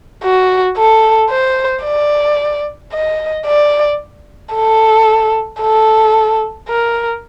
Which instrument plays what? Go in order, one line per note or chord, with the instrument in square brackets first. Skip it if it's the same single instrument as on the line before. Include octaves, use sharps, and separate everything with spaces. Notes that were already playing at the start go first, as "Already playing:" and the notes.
[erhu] F#4
A4
C5
D5
D#5
D5
A4
A4
A#4